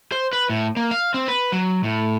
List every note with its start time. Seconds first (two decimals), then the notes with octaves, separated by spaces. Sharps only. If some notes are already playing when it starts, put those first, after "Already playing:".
0.12 C5
0.33 B4
0.50 A2
0.76 A#3
0.91 F5
1.14 C4
1.28 B4
1.52 F#3
1.84 A2